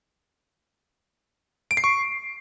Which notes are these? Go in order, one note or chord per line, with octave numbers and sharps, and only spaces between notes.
D7
C7
C#6